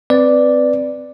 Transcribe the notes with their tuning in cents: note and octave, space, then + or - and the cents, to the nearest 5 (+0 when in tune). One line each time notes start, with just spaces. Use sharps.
C4 -15 B4 +0 D5 +0